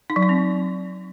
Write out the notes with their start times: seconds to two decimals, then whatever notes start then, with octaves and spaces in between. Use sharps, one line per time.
0.10 D#4
0.16 F#3
0.23 D#4
0.29 C4